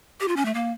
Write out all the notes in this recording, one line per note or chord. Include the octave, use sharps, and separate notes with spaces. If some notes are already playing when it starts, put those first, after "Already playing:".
G4
F4
C#4
A3
A#3